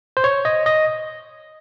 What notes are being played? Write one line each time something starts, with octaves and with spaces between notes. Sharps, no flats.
C5
C#5
D#5
D#5